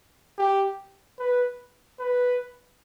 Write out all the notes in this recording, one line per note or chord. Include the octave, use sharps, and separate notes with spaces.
G4
B4
B4